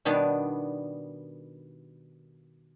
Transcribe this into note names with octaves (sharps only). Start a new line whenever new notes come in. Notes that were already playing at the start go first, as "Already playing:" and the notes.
B2 D#3 G3 B3 D4